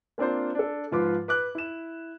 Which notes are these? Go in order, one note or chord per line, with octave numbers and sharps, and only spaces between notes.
A#3 C4 D4 F4 C5
D4 A4
G#2 F3 F4 B4 D6
B4 D6 F#6
E4 E7